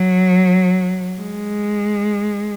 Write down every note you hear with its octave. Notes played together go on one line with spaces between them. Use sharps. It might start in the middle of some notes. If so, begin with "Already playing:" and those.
Already playing: F#3
G#3